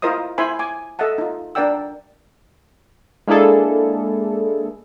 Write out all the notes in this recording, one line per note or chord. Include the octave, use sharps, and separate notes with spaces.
E4 F4 A#4 C5 D#5 D#6
E4 C5 E5 G#5 B5 C6
G#5 D6
A4 D#5 E5 F#5 A5
D#4 F4
D4 A#4 D5 F#5 G5 E6
G#3 A#3 D4 E4 G#4 A4